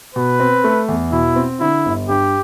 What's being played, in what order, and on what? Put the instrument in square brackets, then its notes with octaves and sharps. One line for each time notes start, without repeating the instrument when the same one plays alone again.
[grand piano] B2 [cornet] B4
[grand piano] C4
A3
E2
[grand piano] B2 [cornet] E4
[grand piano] C4
[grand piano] D3 [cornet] E4
[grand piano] G1
[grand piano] G2 [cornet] G4